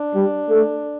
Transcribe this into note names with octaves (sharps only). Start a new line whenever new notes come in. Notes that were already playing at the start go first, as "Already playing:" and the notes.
Already playing: D4
G3
A3